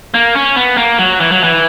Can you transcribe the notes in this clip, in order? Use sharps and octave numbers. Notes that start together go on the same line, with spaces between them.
A#3
C#4
B3
A#3
F#3
E3
F#3
E3